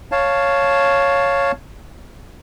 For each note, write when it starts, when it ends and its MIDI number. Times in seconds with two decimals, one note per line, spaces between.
0.12 1.52 73
0.12 1.52 77
0.12 1.52 81